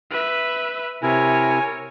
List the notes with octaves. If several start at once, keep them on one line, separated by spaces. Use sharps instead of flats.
B4 E5
C3 E4 A#4 C#5 G#5